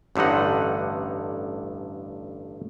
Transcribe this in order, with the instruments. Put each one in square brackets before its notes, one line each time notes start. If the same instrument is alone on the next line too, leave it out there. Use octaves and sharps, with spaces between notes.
[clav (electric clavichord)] A1 G2 D3 D#4 F#5